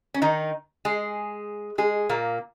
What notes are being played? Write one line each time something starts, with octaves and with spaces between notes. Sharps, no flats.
C#4
D#3 D#4
G#3 G#4
G#3 G#4
A#2 A#3